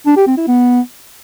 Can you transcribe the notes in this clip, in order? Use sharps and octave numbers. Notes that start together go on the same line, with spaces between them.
D4
G4
C4
E4
B3